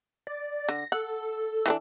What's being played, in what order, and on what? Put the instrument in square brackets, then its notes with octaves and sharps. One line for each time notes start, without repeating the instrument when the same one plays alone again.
[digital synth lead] D5
[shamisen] D3 [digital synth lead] A#6
[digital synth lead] A4 [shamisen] F#5
[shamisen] E3 C4 D4